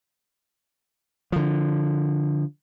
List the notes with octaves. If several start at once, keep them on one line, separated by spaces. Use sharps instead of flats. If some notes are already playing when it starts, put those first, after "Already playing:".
D3 F3